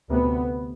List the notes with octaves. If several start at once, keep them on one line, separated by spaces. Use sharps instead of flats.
D2 C3 B3